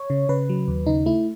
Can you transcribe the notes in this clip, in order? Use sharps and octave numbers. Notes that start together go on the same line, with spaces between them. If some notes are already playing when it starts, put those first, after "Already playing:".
Already playing: C#5
C#3
C#3 B4
F#3
D#2
C#3 D#4
A3 E4